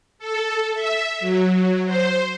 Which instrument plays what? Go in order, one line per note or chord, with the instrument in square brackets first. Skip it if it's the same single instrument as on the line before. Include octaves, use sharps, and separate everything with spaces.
[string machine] A4
E5
F#3
C5